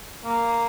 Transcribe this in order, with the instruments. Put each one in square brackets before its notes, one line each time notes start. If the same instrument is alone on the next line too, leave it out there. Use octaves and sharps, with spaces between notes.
[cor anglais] A#3